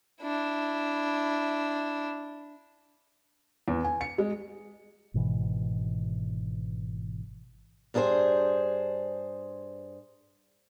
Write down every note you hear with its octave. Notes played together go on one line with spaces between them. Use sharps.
D4 E4
E2
G#5
C#7
G#3
G#1 G#2 B2 E3
G2 D4 G#4 A#4 C5 G5